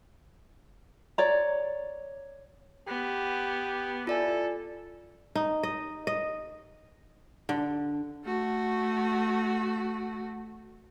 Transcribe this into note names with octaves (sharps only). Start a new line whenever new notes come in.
C#5 D5 A#5
B3 G4
E4 F4 A4 D5 G#5
D#4
D#5
D#5
D3
A3 F#4